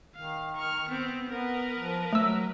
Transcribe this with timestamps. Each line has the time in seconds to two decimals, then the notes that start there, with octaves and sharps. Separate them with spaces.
0.15 D#3 F5
0.56 C#6 F6
0.89 B3 C4
1.30 B3 A#4 B4
1.78 F3
2.13 F#3 A3 E6